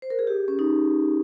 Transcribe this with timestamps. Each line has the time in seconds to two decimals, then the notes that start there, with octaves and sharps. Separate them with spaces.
0.02 C5
0.10 A#4
0.19 G#4
0.27 G4
0.48 C#4
0.59 D#4